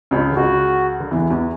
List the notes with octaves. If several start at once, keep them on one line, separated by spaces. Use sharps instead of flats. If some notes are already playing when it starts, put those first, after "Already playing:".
C#2 C#3
D3
C#2 C#3 F#4
D3
E2 E3
E2 E3